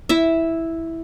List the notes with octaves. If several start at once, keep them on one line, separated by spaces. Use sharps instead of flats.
E4 E5